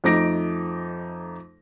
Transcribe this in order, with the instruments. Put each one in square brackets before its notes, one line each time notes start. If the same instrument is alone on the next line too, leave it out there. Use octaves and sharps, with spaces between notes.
[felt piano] F2 A3 D#4 D6 A#6 D7